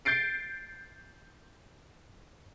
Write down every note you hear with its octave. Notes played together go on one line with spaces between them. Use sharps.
G6 A6 C7 D7